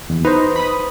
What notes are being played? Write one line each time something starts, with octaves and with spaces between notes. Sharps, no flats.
E2
D#4 B4 C5
B5 D#6